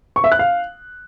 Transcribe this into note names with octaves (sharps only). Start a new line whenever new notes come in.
C#6
E5
F#6
F5